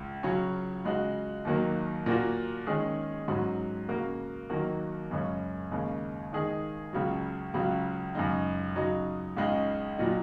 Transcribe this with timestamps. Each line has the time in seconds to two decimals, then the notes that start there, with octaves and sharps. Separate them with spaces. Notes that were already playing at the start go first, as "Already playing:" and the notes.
Already playing: C#2
0.23 C#3 F#3 C#4
0.85 C#3 G#3 F#4
1.45 D#2 D#3 F#3 A#3
2.06 A#2 A#3 F#4
2.67 D#3 G#3 C#4 G#4
3.28 G#2 F#3 C#4 F#4
3.89 C#3 A#3 F#4
4.50 D#2 D#3 F#3 A#3 F#4
5.11 F#2 C#3 G#3 C#4
5.71 D#2 C#3 G#3
6.32 D#3 G#3 D#4 G#4
6.93 C#2 C#3 F#3
7.54 C#2 C#3 F#3
8.15 F#2 C#3 G#3 D#4
8.76 C#3 F#3 D#4
9.37 C#2 C#3 G#3 D#4
9.98 A#2 F#3 D#4